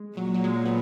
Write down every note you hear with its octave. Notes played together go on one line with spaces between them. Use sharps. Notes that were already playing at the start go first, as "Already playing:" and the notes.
Already playing: G#3
A#2 F#3
F#3
G#3
B3